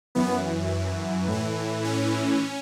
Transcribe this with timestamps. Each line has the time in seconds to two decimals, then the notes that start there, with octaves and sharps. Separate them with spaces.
0.15 F#2 E3 B3
1.28 A2 E3
1.84 C#4